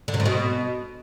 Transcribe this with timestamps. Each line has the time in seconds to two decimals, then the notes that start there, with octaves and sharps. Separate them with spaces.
0.08 D3
0.14 C3
0.20 A2
0.25 B2